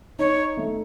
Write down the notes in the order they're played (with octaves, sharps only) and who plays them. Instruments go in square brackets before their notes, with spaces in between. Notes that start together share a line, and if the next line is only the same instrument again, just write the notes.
[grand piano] D#4 [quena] C#5
[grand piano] A3